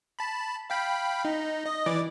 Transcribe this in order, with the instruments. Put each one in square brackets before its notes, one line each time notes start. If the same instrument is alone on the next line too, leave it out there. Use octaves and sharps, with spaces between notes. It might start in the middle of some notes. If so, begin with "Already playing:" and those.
[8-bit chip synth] A5 B5
F5 G5 B5
D#4
D#5
E3 D5 D6